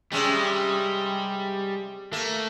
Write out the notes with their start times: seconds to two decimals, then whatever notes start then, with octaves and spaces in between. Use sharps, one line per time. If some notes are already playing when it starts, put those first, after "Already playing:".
0.12 C3 G3 G#3 C#4
2.13 A3 A#3